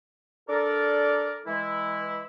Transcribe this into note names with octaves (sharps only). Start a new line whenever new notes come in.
D4 A4 A#4 D5
E3 G#3 E4